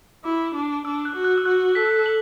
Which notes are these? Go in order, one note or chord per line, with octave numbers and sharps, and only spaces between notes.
E4 D6
D4
D4 E6
F#6
F#4
F#6
E6
F#4 F#6
A4 B6
F#7